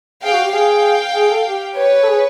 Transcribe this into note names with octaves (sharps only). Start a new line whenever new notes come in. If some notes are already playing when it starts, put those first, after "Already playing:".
G#4 F5 G5
F#4
G4
G#4 F5 G5
G#4
A4
G4
B4 C#5
A4
G#4